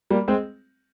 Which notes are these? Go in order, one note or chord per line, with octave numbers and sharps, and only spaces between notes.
G3 A#3
G#3 C4